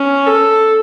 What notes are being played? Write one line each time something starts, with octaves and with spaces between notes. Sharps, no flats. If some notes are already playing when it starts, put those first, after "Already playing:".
Already playing: C#4
A4